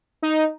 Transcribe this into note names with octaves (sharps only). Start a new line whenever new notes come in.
D#4